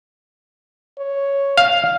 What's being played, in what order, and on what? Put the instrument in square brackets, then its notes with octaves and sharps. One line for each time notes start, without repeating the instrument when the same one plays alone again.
[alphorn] C#5
[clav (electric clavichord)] F5